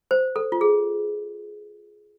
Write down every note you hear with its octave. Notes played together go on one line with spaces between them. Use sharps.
C5
A4
F4
G#4